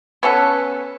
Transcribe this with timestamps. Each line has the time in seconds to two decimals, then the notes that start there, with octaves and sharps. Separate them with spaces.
0.23 B3 C#4 A4 B4